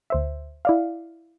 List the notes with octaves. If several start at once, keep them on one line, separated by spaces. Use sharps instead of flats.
D2 C5 E5
E4 D5 F5